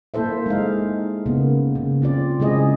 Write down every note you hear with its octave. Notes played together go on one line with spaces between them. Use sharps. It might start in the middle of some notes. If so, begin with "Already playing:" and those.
A#3 E4 A4 C5 E5
G#3 D#4 F5
C#3 A#3 B3
C#3
C4 F4 D5
C#3 G#3 C4 E4 G#4 D#5